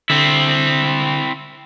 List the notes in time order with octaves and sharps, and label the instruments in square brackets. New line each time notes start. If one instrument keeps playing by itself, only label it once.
[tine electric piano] D3 [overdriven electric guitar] C4 E4